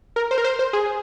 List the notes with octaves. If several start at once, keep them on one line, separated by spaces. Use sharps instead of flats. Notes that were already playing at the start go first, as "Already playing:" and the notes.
A#4
C5
A#4
C5
C5
G#4